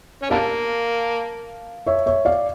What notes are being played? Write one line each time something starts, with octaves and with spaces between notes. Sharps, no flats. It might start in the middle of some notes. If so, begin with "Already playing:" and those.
C#4
D3 G3 A#3 F5 A5
C#5 E5
C#5 E5
D5 F5